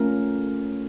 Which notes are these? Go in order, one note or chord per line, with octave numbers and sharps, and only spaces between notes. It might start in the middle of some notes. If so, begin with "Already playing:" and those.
Already playing: A3 C#4 F4 A#4